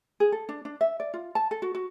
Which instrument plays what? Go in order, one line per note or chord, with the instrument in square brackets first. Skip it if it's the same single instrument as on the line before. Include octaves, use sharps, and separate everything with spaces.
[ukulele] G#4
A4
D4
D4
E5
D5
F4
A5
A4
F#4
F#4